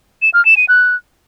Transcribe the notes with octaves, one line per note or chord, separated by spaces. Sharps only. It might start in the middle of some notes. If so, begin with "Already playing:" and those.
E7
F6
E7
D#7
F#6